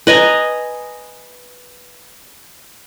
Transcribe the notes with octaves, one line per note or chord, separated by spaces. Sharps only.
B4 D#5 G#5 A#5